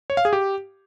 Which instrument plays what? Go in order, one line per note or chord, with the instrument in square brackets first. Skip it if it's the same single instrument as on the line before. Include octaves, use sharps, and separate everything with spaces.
[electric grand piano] C#5
F5
G#4
G4